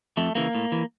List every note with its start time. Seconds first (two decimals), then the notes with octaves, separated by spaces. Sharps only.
0.17 F2 A3
0.35 C#3 E3 A#3
0.55 A2
0.72 E3